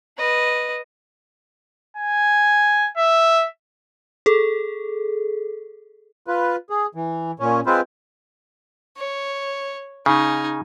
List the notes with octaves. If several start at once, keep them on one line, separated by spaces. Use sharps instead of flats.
B4 D#5
G#5
E5
G#4 A4
F4 B4
G#4
E3
A#2 C#4
G#3 C4 F4 B4 C5
C#5
C#3 D#4 G#5